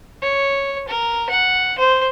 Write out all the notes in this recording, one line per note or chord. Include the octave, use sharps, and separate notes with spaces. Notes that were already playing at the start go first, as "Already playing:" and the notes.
C#5
A#4
F#5
C5